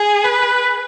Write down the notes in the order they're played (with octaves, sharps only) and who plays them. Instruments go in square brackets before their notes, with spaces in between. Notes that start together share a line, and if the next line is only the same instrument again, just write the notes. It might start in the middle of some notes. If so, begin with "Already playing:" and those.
Already playing: [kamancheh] G#4
B4